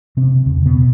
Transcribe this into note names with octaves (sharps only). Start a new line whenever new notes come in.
C3 C4
E2 C#3
B2 B3